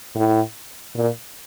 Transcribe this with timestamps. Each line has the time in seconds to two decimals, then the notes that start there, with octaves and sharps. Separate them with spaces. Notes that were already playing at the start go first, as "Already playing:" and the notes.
0.16 A2
0.96 A#2